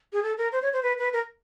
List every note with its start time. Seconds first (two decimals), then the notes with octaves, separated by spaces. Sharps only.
0.13 G#4
0.23 A4
0.38 A#4
0.52 C5
0.62 C#5
0.73 C5
0.83 B4
0.98 B4
1.13 A#4